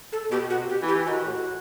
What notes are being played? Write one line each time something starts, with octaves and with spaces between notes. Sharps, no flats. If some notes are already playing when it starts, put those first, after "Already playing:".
A4
B2 G4
B2 F#4
C3
G4
E3
G4
E3
D#3 F#4
A2